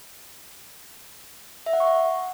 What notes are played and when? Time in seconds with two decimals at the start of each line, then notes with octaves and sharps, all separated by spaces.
1.66 E5
1.73 F#5
1.80 C#6
1.87 F#5